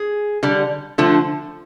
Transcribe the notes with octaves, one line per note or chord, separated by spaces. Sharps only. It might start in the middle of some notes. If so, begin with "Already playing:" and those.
Already playing: G#4
D3 G3
D3 F3 A3